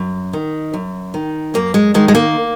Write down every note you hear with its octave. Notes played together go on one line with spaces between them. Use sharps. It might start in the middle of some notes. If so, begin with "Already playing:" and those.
Already playing: F#2
D#3
F#2
D#3
F#2 A#3
G#3
D#3 G#3
G#3
A#3